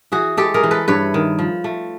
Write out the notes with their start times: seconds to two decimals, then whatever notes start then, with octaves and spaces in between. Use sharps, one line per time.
0.12 E3 F#4 G#4
0.37 G#3 G4 A4
0.54 G#4 A#4
0.63 E3
0.71 A4 B4
0.88 G2 B4 C#5
1.14 D#3
1.39 F3
1.64 A3